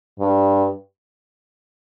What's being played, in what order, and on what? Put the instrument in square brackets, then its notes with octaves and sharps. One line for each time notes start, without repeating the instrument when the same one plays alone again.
[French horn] G2